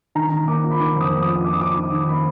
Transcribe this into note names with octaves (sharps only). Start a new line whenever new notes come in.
D#3 A#5
D#3
A#3 D6
F4
B5
D#3 D6
F2 D#6
A#3
D#6
F4
F4 D6
D#6
F4 D6
D#3
D#3
A#3 B5